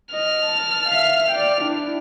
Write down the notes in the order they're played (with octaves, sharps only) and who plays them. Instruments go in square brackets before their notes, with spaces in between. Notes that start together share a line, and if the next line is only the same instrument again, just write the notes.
[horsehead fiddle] D#5 [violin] F6
[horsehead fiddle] A5
E5 F5
D5 G5
D4 E4